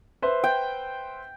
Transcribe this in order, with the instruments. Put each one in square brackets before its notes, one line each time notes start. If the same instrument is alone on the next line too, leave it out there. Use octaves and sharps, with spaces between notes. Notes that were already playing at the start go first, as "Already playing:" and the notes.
[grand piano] B4 C5 E5
[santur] G5